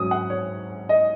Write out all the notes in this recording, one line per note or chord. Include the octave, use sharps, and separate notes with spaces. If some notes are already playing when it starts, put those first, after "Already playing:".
Already playing: G#2 F#3 C#4 D#6
F#5
C#5
D#5